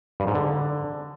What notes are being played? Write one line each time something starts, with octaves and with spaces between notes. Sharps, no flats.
G2
G#2
D3